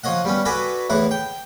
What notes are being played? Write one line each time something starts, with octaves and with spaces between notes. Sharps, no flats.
F3 C#5 D#5 F#5
G3 B3 C#4
F#4 A4 B4 D5 G#5
E2 A2 E4 F#5
G5